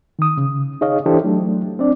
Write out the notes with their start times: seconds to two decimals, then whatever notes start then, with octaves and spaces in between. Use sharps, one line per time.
0.19 D#3 D#6
0.37 C#3
0.81 D#4 G#4 C#5 D#5 F5
1.06 E3 D4 E4 G4 A4 C5
1.24 F#3 A3 D4
1.79 C4 D4 D5